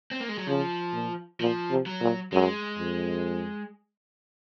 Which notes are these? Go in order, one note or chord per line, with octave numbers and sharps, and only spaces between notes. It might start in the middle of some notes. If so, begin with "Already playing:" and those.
C4
A#3
G#3
F#3
C#3 F3
A#2
A#2 F3
C3
F#3
A#2
F#2 G#3
F2